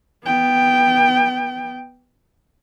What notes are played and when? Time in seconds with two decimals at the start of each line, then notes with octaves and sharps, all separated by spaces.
0.25 B3 G5